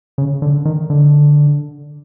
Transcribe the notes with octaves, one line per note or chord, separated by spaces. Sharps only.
C#3
D3
D#3
D3